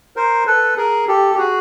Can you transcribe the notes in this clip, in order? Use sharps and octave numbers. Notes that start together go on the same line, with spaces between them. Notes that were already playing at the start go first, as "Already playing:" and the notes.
A#4 C5
A4 B4
G#4 A#4
G4 A4
G4
F#4 G#4